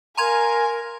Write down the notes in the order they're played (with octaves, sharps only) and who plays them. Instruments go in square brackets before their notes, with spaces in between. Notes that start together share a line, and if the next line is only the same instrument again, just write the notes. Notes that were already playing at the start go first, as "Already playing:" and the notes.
[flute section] A#4 F5 [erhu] G#5 [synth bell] A#5 C6 G#6